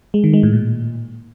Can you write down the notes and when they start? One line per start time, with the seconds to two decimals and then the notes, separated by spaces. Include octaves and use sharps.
0.14 G#3
0.24 D#3
0.33 G#3
0.43 A2
0.53 A#2